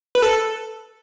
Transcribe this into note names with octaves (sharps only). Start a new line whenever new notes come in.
B4
A4